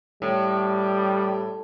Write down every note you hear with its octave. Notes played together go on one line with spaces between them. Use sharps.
A2 G3